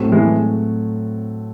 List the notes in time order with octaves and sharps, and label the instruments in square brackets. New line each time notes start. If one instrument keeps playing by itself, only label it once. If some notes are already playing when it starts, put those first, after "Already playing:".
Already playing: [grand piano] A2 F#3 A3 C4
[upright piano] E3 G#3